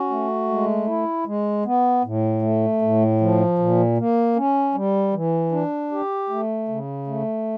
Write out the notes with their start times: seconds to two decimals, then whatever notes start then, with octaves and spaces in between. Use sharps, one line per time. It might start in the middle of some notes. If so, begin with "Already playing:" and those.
Already playing: C#4 F#4
0.10 A3
0.49 G#3
0.87 E4
1.26 G#3
1.65 B3
2.04 A2
2.42 A3
2.82 A2
3.20 F3
3.58 A#2
3.98 A#3
4.36 C#4
4.75 G3
5.14 E3
5.52 D4
5.92 G4
6.29 A3
6.69 C#3
7.07 A3